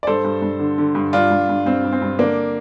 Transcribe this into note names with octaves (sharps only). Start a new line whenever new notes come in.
D5
G2 A4 C5
G2
G2
D3
D3
G2
G2 D4 F4
G2
G2
G2 C4
G2
C4
G2
D3 A#3 D4